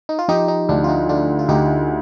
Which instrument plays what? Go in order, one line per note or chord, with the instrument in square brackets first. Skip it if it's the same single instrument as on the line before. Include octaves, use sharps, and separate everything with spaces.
[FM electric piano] D#4
F4
[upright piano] F3 [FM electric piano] D#4 G4
[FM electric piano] D#4
[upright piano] D2 [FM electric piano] D4
[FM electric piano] F4
D#4
[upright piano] D3 [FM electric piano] D4 F4
[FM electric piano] F4
[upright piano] D2 [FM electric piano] D#4 G4